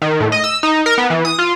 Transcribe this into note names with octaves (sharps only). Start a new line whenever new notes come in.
D#3
A2
D#5
E6
D#4
A#4
B3
E3
D#6
F4